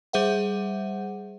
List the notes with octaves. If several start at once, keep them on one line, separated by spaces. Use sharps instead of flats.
G3 G#4 C5 E5 F#5